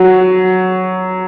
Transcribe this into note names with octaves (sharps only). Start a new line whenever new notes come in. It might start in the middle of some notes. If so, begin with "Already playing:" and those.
Already playing: F#3